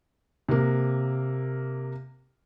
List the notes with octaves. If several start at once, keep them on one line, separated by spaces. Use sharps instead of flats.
C3 A#3